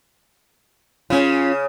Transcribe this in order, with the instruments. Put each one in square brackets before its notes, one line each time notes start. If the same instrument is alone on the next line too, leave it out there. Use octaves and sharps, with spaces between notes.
[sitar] C#3 [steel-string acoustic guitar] C#4 F4